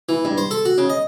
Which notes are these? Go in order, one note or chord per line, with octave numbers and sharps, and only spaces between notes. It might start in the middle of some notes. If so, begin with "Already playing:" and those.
E3
G2
C5
A4
F#4
C#3
D#5